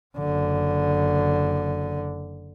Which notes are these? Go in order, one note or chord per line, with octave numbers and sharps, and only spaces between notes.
F#1 D3